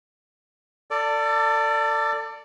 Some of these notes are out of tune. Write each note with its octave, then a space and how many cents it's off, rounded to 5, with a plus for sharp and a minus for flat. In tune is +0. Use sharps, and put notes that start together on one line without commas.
A4 +30 D5 +0